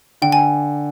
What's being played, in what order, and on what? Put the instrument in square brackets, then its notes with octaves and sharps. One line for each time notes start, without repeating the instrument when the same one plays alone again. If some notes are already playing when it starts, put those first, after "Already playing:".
[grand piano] D3 [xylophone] G5
[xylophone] G#5